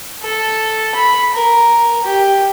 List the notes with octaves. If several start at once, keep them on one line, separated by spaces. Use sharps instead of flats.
A4
B5
A#4
G4